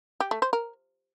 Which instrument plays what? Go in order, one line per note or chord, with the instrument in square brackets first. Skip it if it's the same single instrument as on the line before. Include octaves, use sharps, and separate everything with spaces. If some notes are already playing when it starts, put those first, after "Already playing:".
[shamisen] G4
A3
C5
A#4